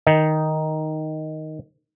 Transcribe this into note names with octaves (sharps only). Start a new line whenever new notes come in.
D#3 D#4